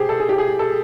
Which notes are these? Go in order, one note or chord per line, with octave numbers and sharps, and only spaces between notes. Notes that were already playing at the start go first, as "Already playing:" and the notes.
Already playing: G4 G#4 C5
A4
G#4
G4
G#4
A4